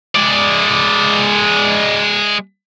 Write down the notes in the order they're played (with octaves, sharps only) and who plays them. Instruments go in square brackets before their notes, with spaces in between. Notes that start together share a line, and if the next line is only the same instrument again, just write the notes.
[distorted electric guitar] G#3 D5